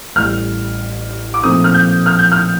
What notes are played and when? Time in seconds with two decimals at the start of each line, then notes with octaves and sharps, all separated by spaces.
0.16 A1 A2 G3 F6
1.34 D6
1.42 A#2 F3 A3 C4 D#4 D#6
1.64 F6
1.74 G6
2.06 F6
2.19 G6
2.32 F6